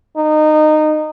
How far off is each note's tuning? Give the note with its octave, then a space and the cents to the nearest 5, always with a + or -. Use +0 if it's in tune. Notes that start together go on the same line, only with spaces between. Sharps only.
D#4 -20